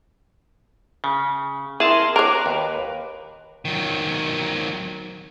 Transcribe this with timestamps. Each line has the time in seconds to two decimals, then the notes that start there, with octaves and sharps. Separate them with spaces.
1.04 C#3
1.80 E4 G#4 A#4 A5 C6
2.16 A#4 C#5 A#5 D6 F#6
2.46 D#2 B4
3.65 D#3 F#3